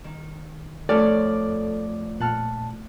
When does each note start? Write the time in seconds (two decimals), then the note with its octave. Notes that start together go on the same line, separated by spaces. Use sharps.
0.04 D#3
0.89 F2 A3 A4 C#5 D5 F6
2.20 A#2 F#5 A5 F6